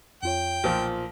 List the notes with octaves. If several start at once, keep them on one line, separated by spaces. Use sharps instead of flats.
F2 F4 C#5 G5
B1 A#2 F3